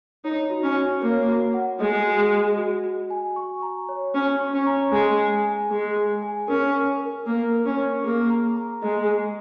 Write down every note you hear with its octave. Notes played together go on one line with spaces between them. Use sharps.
D#4 C#5
F#4
C#4
F#4
A#3 C#5
F#4
F#5
G#3 D#5
F#4
D#5
F#4
F#4
G#5
C#6
A#5
C#5
C#4 C#5
C#6
C#4
A#5
G#3 G#5
G#5
G#5
G#3 G#4
G#4
G#5
C#4 A#4
A#4
A#4
A#3 A#4
A#4
C#4
C#6
A#3 G#4
A#5
A#5
G#3 D#5
G#4